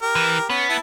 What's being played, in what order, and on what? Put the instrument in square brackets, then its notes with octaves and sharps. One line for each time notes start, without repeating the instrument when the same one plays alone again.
[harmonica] G4 A#4
[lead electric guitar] E3
[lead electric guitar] B3 [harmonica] C#4
[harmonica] E4 A5